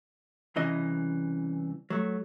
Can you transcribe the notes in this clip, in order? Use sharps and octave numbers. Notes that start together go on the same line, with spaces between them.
C2 C#3 E3 D#5
F#3 A3